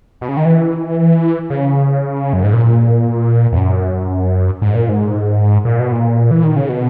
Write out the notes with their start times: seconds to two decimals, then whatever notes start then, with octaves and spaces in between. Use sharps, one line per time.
0.21 B2
0.29 C#3
0.37 D#3
0.45 E3
1.50 C#3
2.33 F#2
2.44 G#2
2.53 A#2
3.52 E2
3.57 F#2
4.62 G#2
4.75 A#2
4.89 G#2
5.65 A#2
5.79 B2
5.92 A#2
6.31 E3
6.44 D#3
6.56 C#3
6.69 B2